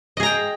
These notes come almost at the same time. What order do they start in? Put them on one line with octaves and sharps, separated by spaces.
D#5 G#4 A#5 G5